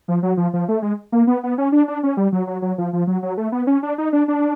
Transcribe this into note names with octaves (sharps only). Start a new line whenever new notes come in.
F3
F#3
F3
F3
A3
G#3
A#3
B3
B3
C#4
D4
D4
C#4
G3
F#3
F#3
F#3
F3
F3
F#3
F#3
A3
B3
C#4
D4
D#4
D4
D4